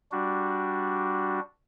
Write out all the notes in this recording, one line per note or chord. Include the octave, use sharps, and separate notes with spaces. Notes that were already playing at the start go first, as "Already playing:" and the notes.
G3 D4 F#4